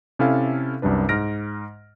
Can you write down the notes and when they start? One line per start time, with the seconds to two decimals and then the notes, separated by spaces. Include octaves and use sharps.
0.19 C3 C#4 E4 A4 F5
0.82 C2 F#2 G3 D4 B4
1.09 G#2 F6 A#6 D7